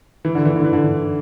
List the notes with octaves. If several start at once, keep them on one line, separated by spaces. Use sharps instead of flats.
E3
D3
E3
D3
E3
D3